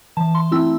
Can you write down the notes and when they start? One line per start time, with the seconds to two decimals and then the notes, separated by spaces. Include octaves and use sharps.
0.17 E3 A5
0.35 C6
0.52 A3 C4 E4 E6